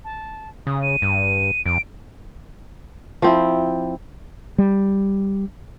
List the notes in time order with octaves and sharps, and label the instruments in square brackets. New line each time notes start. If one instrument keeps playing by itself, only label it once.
[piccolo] A5
[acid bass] C#3 [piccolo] D#6
[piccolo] D#7
[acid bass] G2
[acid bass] F2 [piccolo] D7
[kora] F3 C4 E4
[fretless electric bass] G3